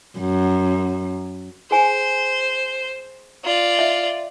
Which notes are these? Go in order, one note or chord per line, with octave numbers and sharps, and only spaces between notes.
F#2
G#4 C5 G#5
F4 D5
E5